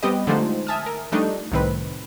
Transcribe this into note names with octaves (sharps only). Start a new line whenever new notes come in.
G3 B3 C4 G4 B4 D#5
D3 F3 G#3 A3 D#4 C5
E5 G#5 A5 D#6 F6
A#4
F3 G3 A3 D4 D#4
C2 A2 D#3 C4 B4